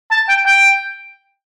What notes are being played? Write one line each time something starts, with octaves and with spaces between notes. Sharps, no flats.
A5
G5
G5